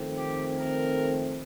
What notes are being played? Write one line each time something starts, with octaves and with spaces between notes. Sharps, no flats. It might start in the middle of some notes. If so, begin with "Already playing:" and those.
Already playing: F2 D#3 A3 C4
G4
A#4